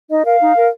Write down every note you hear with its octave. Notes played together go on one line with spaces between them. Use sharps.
D#4 D#5
A#4 F5
D#4
A#4